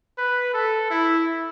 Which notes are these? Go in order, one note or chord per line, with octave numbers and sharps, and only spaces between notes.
B4
A4
E4